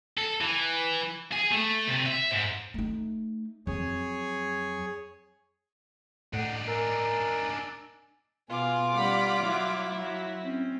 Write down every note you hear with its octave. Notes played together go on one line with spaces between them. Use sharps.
A4
E3
G#4
A3
C3
E5
G#2
A3 D#4
F2 F#3 G#4 C#5
A2 D4 D#4 F#5
A#4 G#5 E6 A6
B2 F4 G#4 D6
G3 C#4 F#5 B5
F#3 E4
F#3
C4 C#4